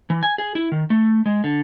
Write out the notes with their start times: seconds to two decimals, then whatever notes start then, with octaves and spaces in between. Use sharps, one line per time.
0.10 E3
0.23 G#5
0.38 G#4
0.55 E4
0.72 D#3
0.90 A3
1.26 G#3
1.44 D3